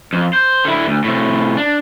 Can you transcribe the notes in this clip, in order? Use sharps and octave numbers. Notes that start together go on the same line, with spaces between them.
F2
C5
D3 E4
D2
A2 C3
D4